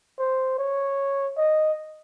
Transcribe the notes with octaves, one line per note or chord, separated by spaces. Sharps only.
C5
C#5
D#5